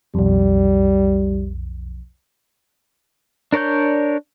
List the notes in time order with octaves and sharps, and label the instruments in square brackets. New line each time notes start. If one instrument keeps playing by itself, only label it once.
[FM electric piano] B1 F2 [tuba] G3
[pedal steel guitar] D4 A#4 C#5 D5 G6